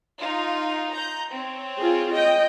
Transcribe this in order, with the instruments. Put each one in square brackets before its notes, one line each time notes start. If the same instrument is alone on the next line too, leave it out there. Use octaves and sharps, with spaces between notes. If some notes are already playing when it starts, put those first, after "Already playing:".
[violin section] D#4 F4
A#5 G6
C4 C#5
[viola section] F4 G#4
D#5 G5